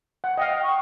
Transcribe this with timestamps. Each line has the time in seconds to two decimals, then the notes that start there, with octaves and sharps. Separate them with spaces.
0.24 F#5
0.38 D#5 F5 G5
0.63 C#6